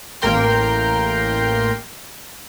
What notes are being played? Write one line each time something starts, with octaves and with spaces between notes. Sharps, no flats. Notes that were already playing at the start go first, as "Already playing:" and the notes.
A1 A#3 A#4 G5 C6